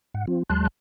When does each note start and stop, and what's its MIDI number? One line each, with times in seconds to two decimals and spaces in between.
0.14 0.26 44
0.14 0.26 78
0.27 0.43 53
0.27 0.43 60
0.27 0.43 65
0.49 0.67 39
0.49 0.67 54
0.49 0.67 56
0.49 0.67 81
0.49 0.67 84
0.49 0.67 90